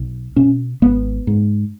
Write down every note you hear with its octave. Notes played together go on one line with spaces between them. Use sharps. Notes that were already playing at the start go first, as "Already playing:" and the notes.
Already playing: B1
B2 C#4
G#1 B3
G#2